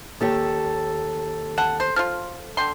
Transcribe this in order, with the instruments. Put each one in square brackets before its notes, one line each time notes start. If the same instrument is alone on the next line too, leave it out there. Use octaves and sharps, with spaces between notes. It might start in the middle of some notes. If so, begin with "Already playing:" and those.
[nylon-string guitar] D#2 G4 C#5 [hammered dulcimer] A4
[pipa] F#5 [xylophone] A5
[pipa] C5
[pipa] F3 F4 [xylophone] F6
[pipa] D3 G5 C6